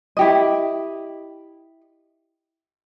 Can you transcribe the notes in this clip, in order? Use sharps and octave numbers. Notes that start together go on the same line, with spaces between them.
E4 G4 D#5